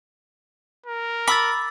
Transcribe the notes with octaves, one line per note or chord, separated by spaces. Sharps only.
A#4
B5 D6 E6 A6